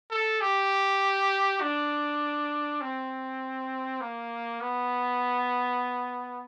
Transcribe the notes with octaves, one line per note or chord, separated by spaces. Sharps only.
A4
G4
D4
C4
A#3
B3